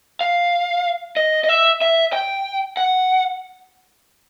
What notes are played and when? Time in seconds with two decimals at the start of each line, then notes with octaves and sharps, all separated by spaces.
0.21 F5
1.17 D#5
1.44 D#5
1.49 E5
1.81 E5
2.13 G5
2.77 F#5